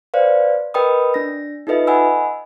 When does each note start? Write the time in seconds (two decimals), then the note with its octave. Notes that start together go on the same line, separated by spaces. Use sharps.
0.14 B4 C5 D5 F5
0.74 A#4 B4 D#5 G5 B5 D#6
1.14 D4 A#6
1.67 D#4 F4 A4 B4 D#5 E5
1.87 D#5 F#5 G#5 B5 E6